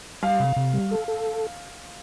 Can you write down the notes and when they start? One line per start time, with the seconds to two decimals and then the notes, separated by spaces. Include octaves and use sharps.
0.23 G3 F5
0.40 C3
0.56 C3
0.74 G3
0.91 A4
1.08 A4